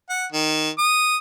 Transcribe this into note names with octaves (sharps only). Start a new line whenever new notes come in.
F#5
D#3
D#6